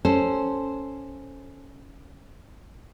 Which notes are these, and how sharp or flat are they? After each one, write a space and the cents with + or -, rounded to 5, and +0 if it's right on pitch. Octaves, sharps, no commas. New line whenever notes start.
C#4 +0 A4 +0 C5 +0